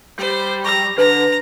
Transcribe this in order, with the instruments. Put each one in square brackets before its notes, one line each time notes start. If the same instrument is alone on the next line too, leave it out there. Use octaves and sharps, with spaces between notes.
[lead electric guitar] G3 [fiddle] C5
[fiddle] A#5 [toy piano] C#6 D6 E6
[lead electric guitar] D3 [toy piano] B4 [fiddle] A#5